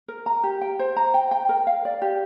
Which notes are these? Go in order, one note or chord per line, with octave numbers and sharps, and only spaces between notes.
A#4
A#5
G4
G5
C5
A#5
G5
G5
A#4
F5
D5
G4